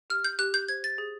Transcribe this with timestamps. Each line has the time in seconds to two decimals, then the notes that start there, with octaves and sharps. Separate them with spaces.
0.10 G4 F6
0.24 G6
0.39 G4 F#6
0.54 G6
0.68 C5 G#6
0.84 A6
0.98 G#4